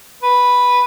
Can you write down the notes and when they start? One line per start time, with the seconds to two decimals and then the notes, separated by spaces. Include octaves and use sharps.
0.22 B4